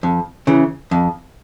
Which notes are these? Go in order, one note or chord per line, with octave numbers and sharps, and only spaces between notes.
F2
C#3 E3
F2